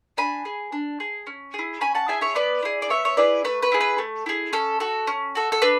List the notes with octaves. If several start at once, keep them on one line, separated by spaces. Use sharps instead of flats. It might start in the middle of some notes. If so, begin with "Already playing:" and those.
D4 G#5 B5
G#4
D4
G#4
C#4
E4 G#4
C#4 G#5 B5
F#5 A5
E4 G#4 E5 G#5
C#5 E5
B3 B4 D5
E4 G#4
D5
B3 C#5 E5
C#5
E4 G#4 B4 D5
A3 B4
B4
E4 G#4
B4
A3
E4 G#4
C#4 A4
F#4 A4
C#4
F#4 A4
A4
D4 B4